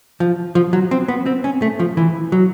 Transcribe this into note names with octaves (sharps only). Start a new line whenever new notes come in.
F3
F3
F#3
C4
B3
C4
C#4
A3
F3
E3
F#3